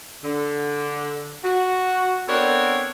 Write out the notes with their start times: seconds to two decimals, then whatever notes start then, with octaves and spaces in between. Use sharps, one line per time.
0.24 D3
1.44 F#4
2.28 B3 C4 D4 A4 A#4 C#5